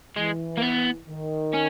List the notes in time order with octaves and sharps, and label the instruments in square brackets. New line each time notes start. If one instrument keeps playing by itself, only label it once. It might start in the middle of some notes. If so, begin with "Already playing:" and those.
[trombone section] E3 [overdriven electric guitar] G#3
[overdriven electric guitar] A#3
B3
[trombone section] D#3
[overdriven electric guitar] C#4